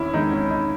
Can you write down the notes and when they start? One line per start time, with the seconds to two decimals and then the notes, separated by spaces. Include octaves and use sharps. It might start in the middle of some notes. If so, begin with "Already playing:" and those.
Already playing: E2 D#3 C#4 E4
0.13 E2 D#3 G#3 D#4
0.31 C#4
0.50 D#4